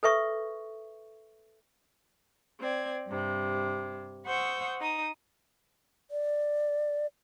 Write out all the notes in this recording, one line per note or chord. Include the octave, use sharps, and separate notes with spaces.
A4 B4 E5 C#6
C4 D5 G#6
G2 C3
C5 F#5 C#6 D#6 E6 G6
D#4 D#6
D5